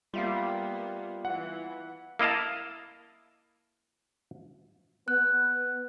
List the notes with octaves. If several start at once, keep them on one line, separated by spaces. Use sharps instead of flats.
G3 A#3 B3 F4 E5 F5
E3 F#5
A#3 E4 D#5 F5 A5
B3 F#6